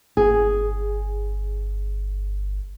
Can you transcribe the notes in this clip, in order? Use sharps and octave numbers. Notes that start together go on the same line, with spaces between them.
G1 G#4